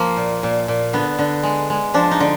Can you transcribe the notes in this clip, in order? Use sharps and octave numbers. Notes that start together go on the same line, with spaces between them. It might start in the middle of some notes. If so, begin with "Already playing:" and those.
Already playing: F3 A#3
A#2
A#2
A#2
D3 B3
D3
G#3
G#3
F3 D4
D#4
D3